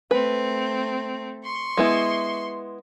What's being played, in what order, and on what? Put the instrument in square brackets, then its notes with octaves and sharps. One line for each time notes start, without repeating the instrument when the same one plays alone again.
[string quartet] A3 C4 [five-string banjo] B4
[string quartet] C6 C#6
[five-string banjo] G#3 B3 E4